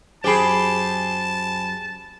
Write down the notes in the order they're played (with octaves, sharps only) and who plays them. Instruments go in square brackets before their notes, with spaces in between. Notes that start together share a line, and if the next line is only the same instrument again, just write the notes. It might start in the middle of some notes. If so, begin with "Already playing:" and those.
[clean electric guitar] F#2 F#3 [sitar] G4 G#4 [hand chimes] C5 G#5 B5 [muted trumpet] A5